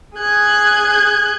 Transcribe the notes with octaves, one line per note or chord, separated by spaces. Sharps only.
G#4 F#6 G#6